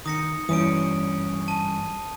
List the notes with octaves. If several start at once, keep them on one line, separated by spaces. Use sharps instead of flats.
D#3 D#6 A#6 C#7
G2 E3 C#4 D#6 D7
A5 D#7